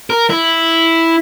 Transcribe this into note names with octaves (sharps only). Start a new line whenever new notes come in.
A#4
E4